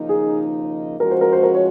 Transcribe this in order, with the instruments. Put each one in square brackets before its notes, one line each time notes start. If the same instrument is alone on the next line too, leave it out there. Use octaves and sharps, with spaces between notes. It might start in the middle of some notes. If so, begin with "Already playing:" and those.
Already playing: [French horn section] D#2 C#3 F3 A#3 D#4
[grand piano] G#4
[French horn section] F3 G#3 C#4 F#4 [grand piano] A#4
[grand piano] C5
A#4
C5
A#4
C#5